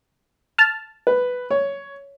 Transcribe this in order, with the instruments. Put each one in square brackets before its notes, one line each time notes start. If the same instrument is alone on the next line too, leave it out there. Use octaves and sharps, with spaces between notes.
[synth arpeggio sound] A5 F6
[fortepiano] B4
C#5